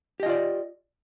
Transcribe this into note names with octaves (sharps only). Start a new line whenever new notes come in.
F4 G4 D5 D#5